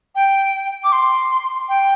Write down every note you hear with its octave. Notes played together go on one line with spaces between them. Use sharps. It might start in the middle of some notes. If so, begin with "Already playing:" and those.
G5
D6
C6
G5